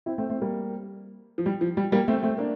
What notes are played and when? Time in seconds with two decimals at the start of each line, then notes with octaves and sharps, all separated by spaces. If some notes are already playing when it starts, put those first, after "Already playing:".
0.06 C4 E4
0.18 A3 C4
0.30 A3 C4
0.41 G3 A#3
1.38 F3
1.46 G3
1.61 F3
1.77 G3
1.92 G3 A#3
2.08 A3 C4
2.23 A3 C4
2.38 A#3 D4